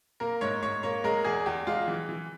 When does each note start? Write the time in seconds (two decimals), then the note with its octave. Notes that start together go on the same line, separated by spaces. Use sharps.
0.20 A#3 A#4
0.41 G#2 C#5
0.63 G#2 C#5
0.83 A#3 C#5
1.04 G#3 A#4
1.24 E2 G#4
1.46 E2 G4
1.67 G#3 F4
1.88 E3
2.09 E3